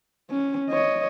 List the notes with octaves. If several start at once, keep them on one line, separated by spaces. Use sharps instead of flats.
C#4
C#5 D#5